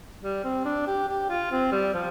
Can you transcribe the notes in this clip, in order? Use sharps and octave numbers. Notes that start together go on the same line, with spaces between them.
G3
C4
D4
G4
G4
F4
C4
G3
F3